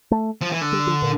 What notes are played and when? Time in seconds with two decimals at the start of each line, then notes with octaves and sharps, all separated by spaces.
0.11 A3
0.41 F3
0.52 E3
0.61 D3
0.72 G3
0.87 F3
1.02 A#2